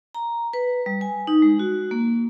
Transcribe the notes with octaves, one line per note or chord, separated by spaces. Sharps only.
A#5
B4
G3
G#5
D#4
G#3
F#4
A#3